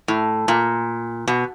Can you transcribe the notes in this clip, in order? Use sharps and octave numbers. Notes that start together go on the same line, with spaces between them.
A2
A#2
B2